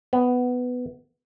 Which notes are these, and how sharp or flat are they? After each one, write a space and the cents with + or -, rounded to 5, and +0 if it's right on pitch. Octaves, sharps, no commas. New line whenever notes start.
B3 +10